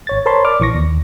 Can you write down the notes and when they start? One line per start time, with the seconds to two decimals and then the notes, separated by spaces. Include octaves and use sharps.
0.07 G#1 C#5 A6
0.26 A#4 C5 C#5 A5 B5 C6
0.45 D5 D6 F6
0.60 A#1 E3 C#6 A#6
0.75 D#2